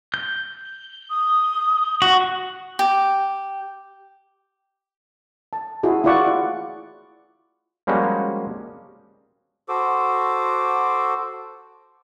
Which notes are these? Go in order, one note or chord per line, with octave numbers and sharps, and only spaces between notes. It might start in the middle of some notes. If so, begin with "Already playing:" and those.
G6
D#6
F#4
G4
A5
E4 F#4 G#4
E4 F4 G#4 D5 F#5 C#6
F3 G3 G#3 A#3 C#4 F#4
F#4 A4 C5 D6